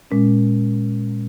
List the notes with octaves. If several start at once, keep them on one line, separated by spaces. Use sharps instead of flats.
A#2 G#3 C#4